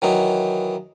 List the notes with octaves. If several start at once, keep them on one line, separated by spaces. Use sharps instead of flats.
D#3 E3 F#3 D#4